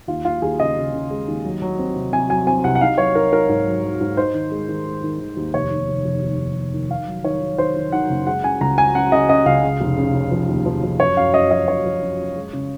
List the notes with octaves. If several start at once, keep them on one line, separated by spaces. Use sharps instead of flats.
D#2 F4
D#2 F4
D#2 G#4
C#3 D#5
C#3
C#3
G#3
D#2
F#3
F#3
C4
C3
C3 G#5
F#3 G#5
C4 G#5
C2 F#5
F#5
D#4 F5
F#3 C#5
D#4 A#4
D#4 A#4
G#2
F#3
F#3
G#2
D#4 C5
D#3
G#3
D#3
G#3
D#3
D#3
D#2
F1 C#5
D#2
F1
F1
D#2
F1
D#2
D#3
D#3 F5
F#3
D#3 C#5
D#3
D#3 C5
D#3
D#3 F#5
F#1
G#3 F#5
C#4 G#5
C#2 A#5
C#4 G#5
C#4 F#5
C#3 D#5
C#4 D#5
C#2 F5
C#3
F1
C#3
C#3
F3
D#2
F3
F3
F#2 C#5
F#2 F5
F#2 D#5
F3 D#5
F#2 C#5
F3
F#2
F#2
G#3
C#3